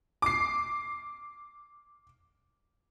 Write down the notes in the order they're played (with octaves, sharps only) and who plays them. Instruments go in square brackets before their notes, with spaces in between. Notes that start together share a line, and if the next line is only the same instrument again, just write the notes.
[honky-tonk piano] D6 C7